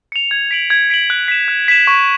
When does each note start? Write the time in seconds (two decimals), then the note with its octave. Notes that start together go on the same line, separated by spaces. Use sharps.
0.12 C#7 F7
0.31 G#6
0.51 B6 D7 F#7
0.70 G#6
0.90 B6 D7 F#7
1.10 F#6
1.28 B6 E7
1.48 F#6
1.68 B6 E7
1.87 C#6